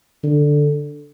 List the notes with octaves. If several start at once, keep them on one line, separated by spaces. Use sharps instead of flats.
D3